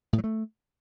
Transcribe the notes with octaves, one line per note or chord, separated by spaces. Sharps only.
A2
F#3
A3